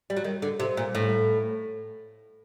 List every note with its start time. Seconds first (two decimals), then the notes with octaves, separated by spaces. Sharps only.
0.10 G3
0.17 F#3
0.24 D#3
0.42 D3
0.60 C3
0.77 A#2
0.95 A2